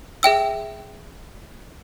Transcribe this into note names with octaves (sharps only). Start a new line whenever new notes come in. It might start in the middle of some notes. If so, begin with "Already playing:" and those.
G#4 E5 G5 E6